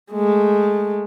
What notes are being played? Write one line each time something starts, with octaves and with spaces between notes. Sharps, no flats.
G#3 A3